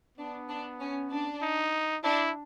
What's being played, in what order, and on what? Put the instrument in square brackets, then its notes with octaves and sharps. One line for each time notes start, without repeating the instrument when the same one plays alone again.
[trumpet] B3 [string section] D4
[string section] D4
C#4
D4
[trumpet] D#4
[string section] D4 [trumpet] E4